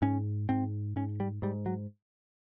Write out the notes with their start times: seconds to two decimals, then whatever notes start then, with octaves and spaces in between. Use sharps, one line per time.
0.02 G#2 C#4
0.49 G#2 C4
0.96 G#2 C#4
1.20 G3
1.42 G#2 G3
1.66 F#3